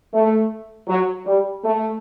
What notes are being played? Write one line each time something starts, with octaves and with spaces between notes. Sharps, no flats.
A3
F#3
G3
A3